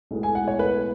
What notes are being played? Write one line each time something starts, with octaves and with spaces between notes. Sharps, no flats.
B1 A2 G#3 B3
G#5
F#5
C#5
B4